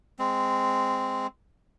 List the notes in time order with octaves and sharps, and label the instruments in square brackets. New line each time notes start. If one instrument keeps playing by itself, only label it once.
[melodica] G#3 C4